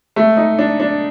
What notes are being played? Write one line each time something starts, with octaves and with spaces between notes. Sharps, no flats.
A3
D#4
D4
D4